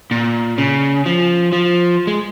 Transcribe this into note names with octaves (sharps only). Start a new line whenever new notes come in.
A#2
C#3
F3
F3
G#3